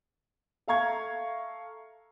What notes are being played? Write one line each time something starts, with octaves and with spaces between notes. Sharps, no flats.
A4 E5 F5 A#5 C#6 G#6